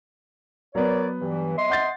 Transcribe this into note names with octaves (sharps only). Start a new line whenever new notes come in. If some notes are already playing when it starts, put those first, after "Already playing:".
F#3 B3 A#4 C#5 D5
G2 E3
D#5 E5 C6
F#5 G6 A6